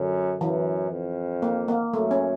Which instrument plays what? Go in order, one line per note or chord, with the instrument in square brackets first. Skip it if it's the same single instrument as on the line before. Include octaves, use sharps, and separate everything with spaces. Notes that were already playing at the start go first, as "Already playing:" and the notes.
Already playing: [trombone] F#2 [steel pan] D3
[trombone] F#2 [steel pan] E3
[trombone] F2
[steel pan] A#3
A#3
[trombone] F#2 [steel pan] A3
[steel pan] C#4